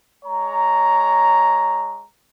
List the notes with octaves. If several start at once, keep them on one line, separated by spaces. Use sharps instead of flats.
G#3 C#5 A#5